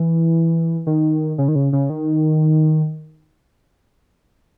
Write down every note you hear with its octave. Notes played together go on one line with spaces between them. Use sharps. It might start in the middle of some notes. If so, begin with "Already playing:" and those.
Already playing: E3
D#3
C#3
D#3
C#3
C#3
D#3